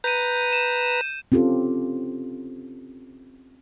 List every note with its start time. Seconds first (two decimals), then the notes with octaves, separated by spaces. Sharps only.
0.04 B4 A#5 G6 D#7
0.53 E7
1.32 C4 C#4 F4 G4 A4